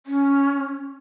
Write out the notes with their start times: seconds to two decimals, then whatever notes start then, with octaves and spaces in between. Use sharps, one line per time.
0.06 C#4